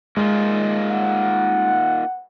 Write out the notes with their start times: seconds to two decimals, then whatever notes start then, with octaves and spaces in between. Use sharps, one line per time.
0.17 G#3 A#3 D#4 F4
0.90 F#5